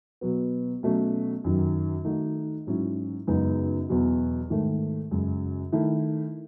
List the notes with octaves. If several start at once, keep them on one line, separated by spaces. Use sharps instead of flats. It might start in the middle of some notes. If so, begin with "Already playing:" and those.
B2 F#3 B3
B2 F#3 A3 C#4
F#2 D#3 F#3
D#3 A3 D#4 F#4
G#2 F#3 C#4 E4
F#2 C#3 G#3 B3 D#4
E2 B2 F#3
G#2 D#3 A3
F#2 C#3 G#3
D#3 A3 E4